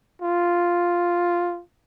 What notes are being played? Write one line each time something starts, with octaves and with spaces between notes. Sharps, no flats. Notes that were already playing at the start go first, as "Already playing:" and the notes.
F4